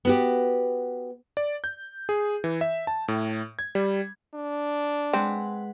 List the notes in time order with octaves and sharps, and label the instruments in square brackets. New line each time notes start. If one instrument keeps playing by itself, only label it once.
[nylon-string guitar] B3 F#4 G4
[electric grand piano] D5
G6
G#4
E3
E5
A5
A2
G#6
G3
[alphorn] D4
[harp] G#3 B4 F#5 [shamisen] C4